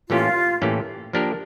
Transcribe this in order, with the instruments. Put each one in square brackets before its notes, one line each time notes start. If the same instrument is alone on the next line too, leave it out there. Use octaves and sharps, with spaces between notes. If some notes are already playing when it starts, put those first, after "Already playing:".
[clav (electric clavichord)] A2 E3 A#3 C#4 G4 [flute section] F4
[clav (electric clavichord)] A2 E3 A#3 C#4 G4
F3 A#3 D4 G4 A#4